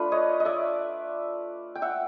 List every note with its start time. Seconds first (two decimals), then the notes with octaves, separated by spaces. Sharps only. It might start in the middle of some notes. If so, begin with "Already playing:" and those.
Already playing: A3 D4 F4 B4
0.12 C#5 D#5
0.40 D#5
0.45 D5 E5
1.75 G5
1.82 E5 F#5